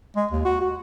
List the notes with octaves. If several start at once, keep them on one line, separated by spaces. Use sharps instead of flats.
G#3
D#2
F#4
F#4